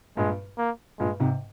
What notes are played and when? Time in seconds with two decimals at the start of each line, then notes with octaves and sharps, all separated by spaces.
0.17 G2 A#2 G#3
0.58 A#3
0.99 G2 A#2 G#3
1.20 G#2 C3